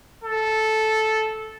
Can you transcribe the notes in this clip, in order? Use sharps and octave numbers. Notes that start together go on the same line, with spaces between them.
A4